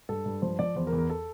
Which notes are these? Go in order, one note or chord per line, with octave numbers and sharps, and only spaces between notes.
G2 A4
G2
F3 C5
F3 D5
E2 C5
A#4
E2
A#4
A4